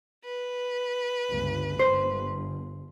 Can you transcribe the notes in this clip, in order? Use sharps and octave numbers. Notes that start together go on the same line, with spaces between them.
B4
G1 C#2
G1 C5